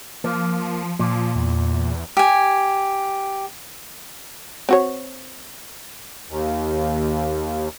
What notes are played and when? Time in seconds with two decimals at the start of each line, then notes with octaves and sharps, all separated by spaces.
0.24 F3 A#3
0.99 A#2 F3
1.36 E2
2.17 G4 G#5
4.69 C4 F#4 C#5
6.29 D#2